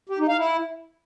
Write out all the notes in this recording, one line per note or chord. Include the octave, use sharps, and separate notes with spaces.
G4
D#4
F5
E4